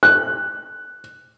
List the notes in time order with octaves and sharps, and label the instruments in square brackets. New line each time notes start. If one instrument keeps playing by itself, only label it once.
[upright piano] F#6